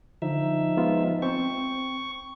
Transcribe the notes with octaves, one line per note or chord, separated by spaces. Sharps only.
D3 F3 D#4 E5
G#3 B3 F4
C4 G5 C#6